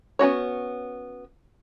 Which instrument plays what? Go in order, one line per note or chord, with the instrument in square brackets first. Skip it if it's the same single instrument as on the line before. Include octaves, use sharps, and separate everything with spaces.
[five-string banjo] B3 C#4 F#4 C#5